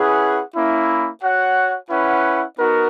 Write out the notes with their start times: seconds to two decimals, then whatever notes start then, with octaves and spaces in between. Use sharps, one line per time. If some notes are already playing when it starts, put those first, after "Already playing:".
Already playing: C#4 E4 G#4 B4 F#5
0.55 A#3 C#4 E4
1.22 F#4 C#5 F#5
1.89 C#4 E4 B4 F#5
2.57 B3 D#4 F#4 A#4